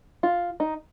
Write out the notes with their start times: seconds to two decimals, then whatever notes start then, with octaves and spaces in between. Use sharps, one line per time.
0.23 F4
0.60 D#4